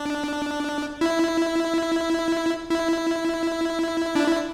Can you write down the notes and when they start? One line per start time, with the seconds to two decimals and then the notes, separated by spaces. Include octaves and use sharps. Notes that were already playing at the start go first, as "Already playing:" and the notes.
Already playing: D4
1.01 E4
2.70 E4
4.15 D4
4.27 E4